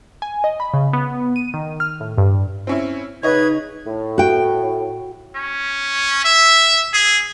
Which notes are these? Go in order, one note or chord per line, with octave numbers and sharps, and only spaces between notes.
G#5
D#5
B5
C#3
B3
D#7
D#3
F6
A2
G2
C4 C#4 E4
C#3 D#4 B4 C#5 D#5 G#6
A2
F#4 G5
C#4
E5
G#4